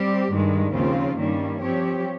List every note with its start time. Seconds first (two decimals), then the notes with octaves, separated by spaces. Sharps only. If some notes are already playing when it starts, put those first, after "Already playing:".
Already playing: G3 C4 G4
0.31 G2 D#3 G#3
0.74 D#2 C#3 F3 C4 F4
1.17 G2 D#3 G3 A#3 C#4
1.60 F3 C4 G4 C#5